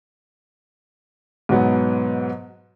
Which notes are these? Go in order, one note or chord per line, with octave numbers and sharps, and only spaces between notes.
G#2 B2 F#3 B3